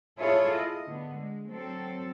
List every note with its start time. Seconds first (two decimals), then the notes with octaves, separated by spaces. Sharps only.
0.19 E4 F4 G#4 A4 C#5
0.54 D#5
0.86 D3 B3
1.19 G#3
1.49 F#3 C4 A4